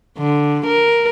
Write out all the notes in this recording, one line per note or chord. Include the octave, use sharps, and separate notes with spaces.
D3
A#4